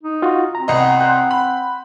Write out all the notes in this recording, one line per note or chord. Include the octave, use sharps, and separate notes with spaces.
D#4
F4 F#4
C4 A#5
C2 B3 D#5
C5 F#5
B5